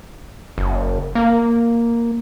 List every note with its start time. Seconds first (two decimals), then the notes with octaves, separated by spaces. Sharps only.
0.58 F#1
1.15 A#3